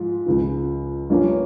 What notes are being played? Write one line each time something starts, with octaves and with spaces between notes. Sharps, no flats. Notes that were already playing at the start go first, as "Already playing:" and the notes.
Already playing: G#2 F3 F4
C#2 C#3 F3
G2 F3 A#3 C#4